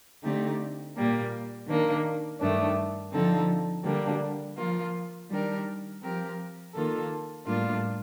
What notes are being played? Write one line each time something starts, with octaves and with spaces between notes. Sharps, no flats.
D3 A3 C4 D#4 G4
A#2 G3 A#3
D#3 A#3 D4
G2 D#3 A3 D4
D3 F3 C4 D#4 A4
D3 G3 A#3 D4
F3 A#3 F4
D#3 G3 D4 G4 A#4
F3 C4 G4 A#4
D#3 A#3 F4 A4
A2 G3 A#3 D4 F4